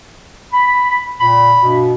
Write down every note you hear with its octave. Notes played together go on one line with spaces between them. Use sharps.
B5
A#2 B5
G2 B2